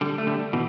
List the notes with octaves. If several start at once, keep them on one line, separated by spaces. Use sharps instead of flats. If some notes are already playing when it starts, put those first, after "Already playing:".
D3 G3
A3
D3 G3
B2 E3